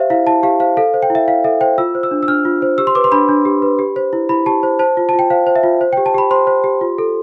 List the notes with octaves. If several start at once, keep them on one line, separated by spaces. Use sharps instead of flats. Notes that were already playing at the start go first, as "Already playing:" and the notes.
Already playing: G4 C5 E5 F5
E4 F5
E4 A5
G4 F5
C5 F5
A4 F5
C5
G5
E4
E5
E4 F5
A4 E5
C5 G5
F4 E6
C5
E6
D4
E6
D4 F6
F4
C5
G4 E6
C6
B4 D6
C6
D4 B5
D4
G4
B4
G4
C5
E4
E4 B5
G4 A5
C5
C5 A5
F4
F4 A5
G5
C5 F5
C5
E5
F4
C5
G4 G5
A5
G4 B5
C5 C6
C5
G4
F4
A4